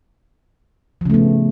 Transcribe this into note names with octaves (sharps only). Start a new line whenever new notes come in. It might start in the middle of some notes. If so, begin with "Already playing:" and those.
C#3 F3 A3 B3